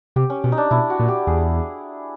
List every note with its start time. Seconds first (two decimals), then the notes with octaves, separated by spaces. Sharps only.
0.16 C3 G4
0.30 C#4
0.44 B2 C#4
0.52 D#4
0.58 D4
0.71 B2 E4
0.90 F#4
0.99 A#2
1.08 G4
1.27 E2 G#4